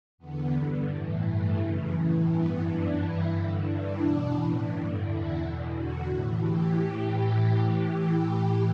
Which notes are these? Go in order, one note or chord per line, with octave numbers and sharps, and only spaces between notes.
E2 D3 B3
G2 D3
A2 E3
G2 E3 A3
F#2 C#3 E3
A2 E3
G2 E3 B3
F#2 E3 D4
G2 E3 E4
G2 D3
G2 E3 D4
E2 B2 D4
A2 E3 C#4
G2 D3 D4
E2 D3 E4
E2 B2
E2 D3 F#4
A2 E3
A2 E3 G4